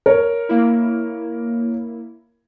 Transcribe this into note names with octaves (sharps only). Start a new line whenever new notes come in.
A#4 C#5
A#3 E4